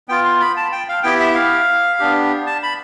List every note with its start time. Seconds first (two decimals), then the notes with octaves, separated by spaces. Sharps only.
0.08 B3 F4 G5
0.25 C6
0.41 B5
0.57 A5
0.72 G5
0.89 F5
1.03 B3 E4 G4 G5
1.20 E5
1.35 F5
1.99 B3 D4 G4
2.47 A5
2.63 B5